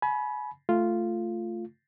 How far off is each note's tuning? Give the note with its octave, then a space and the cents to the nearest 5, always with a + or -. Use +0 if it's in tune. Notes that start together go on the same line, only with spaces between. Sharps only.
G#5 +35 B5 -15
A3 +0 F4 -5